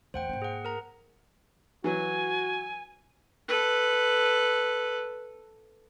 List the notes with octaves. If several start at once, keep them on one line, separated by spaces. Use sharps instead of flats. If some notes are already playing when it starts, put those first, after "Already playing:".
E2 A3 C5 F#5 G5
G#2 A#3
G#4 F#5
A#4 A#5
E3 F#3 F#4 G#5
A4 B4